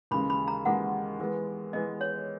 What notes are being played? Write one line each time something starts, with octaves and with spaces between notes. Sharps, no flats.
D#2 C#3 E3 G#3 B5
B5
A#5
D#2 C#3 E3 G#3 F#5
E3 G#3 B3
E3 G#3 B3 D#5
C#5